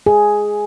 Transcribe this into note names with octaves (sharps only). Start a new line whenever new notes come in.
G#4